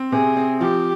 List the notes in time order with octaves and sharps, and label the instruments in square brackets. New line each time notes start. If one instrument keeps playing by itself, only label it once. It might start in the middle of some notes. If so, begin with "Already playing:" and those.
Already playing: [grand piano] C4
[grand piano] C3 [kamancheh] G#4
[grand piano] C4
[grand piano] F3 [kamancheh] G4